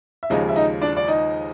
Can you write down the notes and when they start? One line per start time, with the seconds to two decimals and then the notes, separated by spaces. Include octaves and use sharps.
0.23 E5
0.30 D#2 C#3 F3 G#3 D#4 D#5
0.49 E5
0.56 D#4 D#5
0.81 D4 D5
0.97 D5
1.08 D#4 D#5